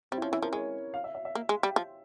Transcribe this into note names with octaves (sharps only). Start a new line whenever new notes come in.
G3 C4
E4
F3 C#4
E3 E4
F3 A#4
G#3 C#5
F5
E5
E5
E5
A#3
G#3
G3
F3